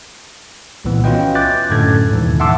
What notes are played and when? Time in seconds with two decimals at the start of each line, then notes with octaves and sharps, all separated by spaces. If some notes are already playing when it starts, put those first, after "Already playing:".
0.84 C2 A#2 D#3 E3 B3
1.04 C#4 F4 F#4 B4 D#5 G5
1.35 E5 D6 F#6 G6 A6
1.70 F#2 A2 D3 C#4 A4 G#6
2.11 D#2 G#2 B2 D#3 E3
2.40 E5 F#5 A5 C6 D6 E6